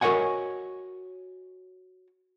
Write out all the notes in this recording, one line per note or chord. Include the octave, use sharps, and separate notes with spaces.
F#4 A#4 C#5 D#5 F#5 G#5